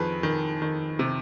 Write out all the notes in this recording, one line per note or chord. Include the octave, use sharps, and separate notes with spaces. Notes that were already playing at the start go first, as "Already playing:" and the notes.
Already playing: F2 D#3 G#4 B4
D#3
D#3
C3